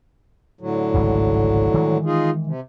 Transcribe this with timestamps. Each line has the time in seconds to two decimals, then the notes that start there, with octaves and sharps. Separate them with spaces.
0.61 A2 D3 F#3
0.94 G#1 C#2 G#2
1.74 D#3 E3 G#3
2.05 D#4 F4 G#4
2.47 C3